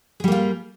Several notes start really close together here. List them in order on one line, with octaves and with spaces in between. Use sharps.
G#4 G3 A#3 F4